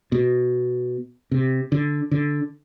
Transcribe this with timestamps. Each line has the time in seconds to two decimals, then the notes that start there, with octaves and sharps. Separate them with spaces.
0.12 B2
1.31 C3
1.72 D3
2.11 D3